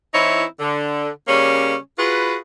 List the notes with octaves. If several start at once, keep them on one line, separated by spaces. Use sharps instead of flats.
E3 C4 D#4 E4 C#5
D3
C#3 G3 A#3 C#4
F4 F#4 G#4 B4